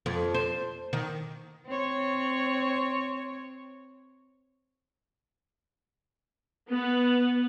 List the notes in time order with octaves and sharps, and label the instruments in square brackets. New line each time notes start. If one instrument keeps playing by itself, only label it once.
[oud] F2
C5
D#3
[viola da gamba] C4 C#5
[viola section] B3